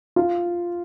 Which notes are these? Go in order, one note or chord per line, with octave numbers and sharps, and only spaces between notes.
F4